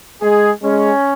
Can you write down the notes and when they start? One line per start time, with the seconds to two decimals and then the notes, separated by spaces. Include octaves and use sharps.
0.22 G#3 G#4
0.63 G#3 C#4